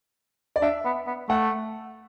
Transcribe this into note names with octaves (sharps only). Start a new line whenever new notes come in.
D5
D4 E5
B3
B3
A3 F#5